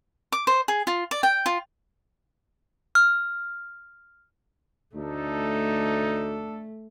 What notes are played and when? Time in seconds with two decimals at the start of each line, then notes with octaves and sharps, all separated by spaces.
0.32 D6
0.47 C5
0.68 G#4
0.87 F4
1.11 D5
1.23 G5
1.46 F4
2.95 F6
4.96 D2 A3 D4 D#4 A4